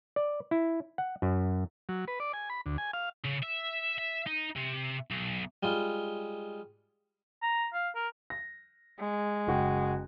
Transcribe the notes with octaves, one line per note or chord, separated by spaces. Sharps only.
D5
E4
F#5
F#2
F#3
B4
D5
G#5
B5
D2
G#5
F5
C#3
E5
E5
D#4
C3
B1
G3 G#3 F4
A#5
F5
A#4
A#6
G#3
F#1 F#4 G5